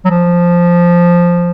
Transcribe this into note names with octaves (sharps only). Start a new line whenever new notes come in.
F#3
F3